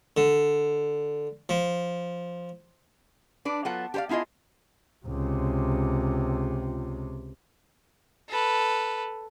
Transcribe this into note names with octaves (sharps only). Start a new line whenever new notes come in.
D3
F3
D4 B4 D5
F#3 B3 F4 A4 F#5
G4 A4 C5 D5 F5
B3 E4 F4 G#4 D#5
C#2 C3
A4 B4